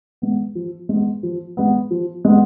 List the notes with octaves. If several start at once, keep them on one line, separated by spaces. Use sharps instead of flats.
G#3 B3
F3
G#3 B3
F3
G#3 B3
F3
G#3 B3